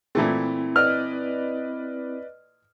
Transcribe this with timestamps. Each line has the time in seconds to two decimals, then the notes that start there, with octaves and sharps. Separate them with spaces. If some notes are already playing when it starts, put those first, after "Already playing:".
0.15 A#2 E3 A3 C4 E4
0.76 B4 D5 D#5 F6